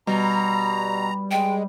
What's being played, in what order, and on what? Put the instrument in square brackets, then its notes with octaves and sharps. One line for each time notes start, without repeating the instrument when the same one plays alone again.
[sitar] B2 [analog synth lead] G3 [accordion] A#5
[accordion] G#3 [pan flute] G5